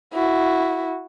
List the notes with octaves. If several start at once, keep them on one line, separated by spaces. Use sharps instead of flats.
E4 F#4